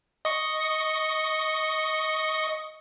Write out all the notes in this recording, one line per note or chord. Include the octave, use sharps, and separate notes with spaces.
D#5 C#6